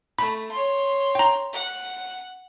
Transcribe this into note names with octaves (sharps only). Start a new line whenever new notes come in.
A3 B5
C#5 C6
G5 A#5
F#5